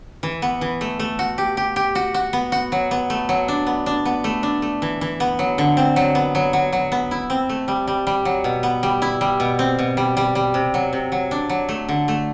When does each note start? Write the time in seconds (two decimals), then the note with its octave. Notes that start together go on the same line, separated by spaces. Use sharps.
0.23 E3
0.42 B3
0.61 E3
0.81 A3
0.99 A3
1.19 F#4
1.38 G4
1.57 G4
1.76 G4
1.95 F#4
2.14 F#4
2.33 B3
2.52 F#4
2.72 F#3
2.91 B3
3.10 A3
3.29 F#3
3.48 D4
3.67 B3
3.86 D4
4.05 B3
4.24 A3
4.43 D4
4.62 A3
4.82 E3
5.01 E3
5.20 B3
5.39 F#3
5.58 D3
5.77 C4
5.96 F#3
6.15 B3
6.35 F#3
6.53 F#3
6.73 F#3
6.92 B3
7.11 E4
7.30 C4
7.49 A3
7.68 G3
7.88 G3
8.07 G3
8.25 F#3
8.44 B2
8.63 B3
8.83 G3
9.02 E4
9.21 G3
9.40 B2
9.59 C4
9.79 B2
9.97 G3
10.17 G3
10.35 G3
10.54 C3
10.74 F#3
10.93 C3
11.12 F#3
11.31 D4
11.50 F#3
11.69 A3
11.89 D3
12.08 A3